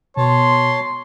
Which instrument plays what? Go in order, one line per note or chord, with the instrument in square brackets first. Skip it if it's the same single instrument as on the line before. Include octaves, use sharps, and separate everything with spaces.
[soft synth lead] B2 [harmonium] C#5 A5 [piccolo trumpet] C6